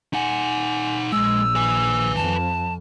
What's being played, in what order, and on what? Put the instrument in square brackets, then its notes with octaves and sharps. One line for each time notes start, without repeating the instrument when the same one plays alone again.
[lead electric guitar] D#4 F#5 [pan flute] G#5
[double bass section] A#1 [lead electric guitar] G#3 [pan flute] E6
[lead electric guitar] B4 G#5
[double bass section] F2 [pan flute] A5